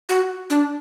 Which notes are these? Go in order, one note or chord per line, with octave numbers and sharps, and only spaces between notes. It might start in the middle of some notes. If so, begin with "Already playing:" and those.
F#4
D4